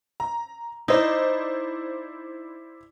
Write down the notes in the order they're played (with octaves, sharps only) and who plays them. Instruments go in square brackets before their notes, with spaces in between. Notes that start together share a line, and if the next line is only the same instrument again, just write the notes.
[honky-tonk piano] A#5
[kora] D#4 [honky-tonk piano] E4 C5 D5